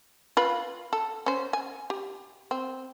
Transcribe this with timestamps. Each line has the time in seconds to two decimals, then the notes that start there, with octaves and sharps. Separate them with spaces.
0.37 F4 B4
0.93 A4
1.26 C#4 C5
1.53 G#5
1.90 G4
2.51 C4